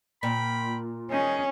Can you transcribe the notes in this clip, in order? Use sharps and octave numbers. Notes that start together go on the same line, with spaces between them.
A#2 G5 B5
D#3 C#4 D#4 G#4